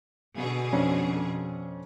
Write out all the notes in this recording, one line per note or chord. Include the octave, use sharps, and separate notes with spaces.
B2 D3 G#4
F2 C#4 D4